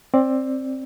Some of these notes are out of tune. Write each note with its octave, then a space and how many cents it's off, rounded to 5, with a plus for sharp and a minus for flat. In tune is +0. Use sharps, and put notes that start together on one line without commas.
C4 +15 D5 +0